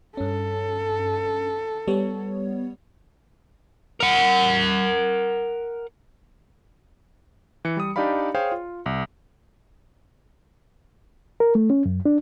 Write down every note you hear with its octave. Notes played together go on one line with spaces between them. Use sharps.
G2 C#4 A4
G3 B3 C#5
A#4 F#5
E3 C#7
G3 D#6
D4 D#4 G4 D5 F5 B5
G#4 C5 C#5 F5 G5
F4
C2
A#4
A3
C#4
F#2
D4